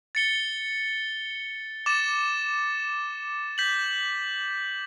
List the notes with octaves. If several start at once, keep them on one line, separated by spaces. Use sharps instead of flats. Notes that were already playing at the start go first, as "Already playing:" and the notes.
A6 C#7 G7
D6 A6 E7
G6 B6 F#7